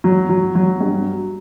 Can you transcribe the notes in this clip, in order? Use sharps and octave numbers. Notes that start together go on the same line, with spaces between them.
F#3
F#3
F#3
G2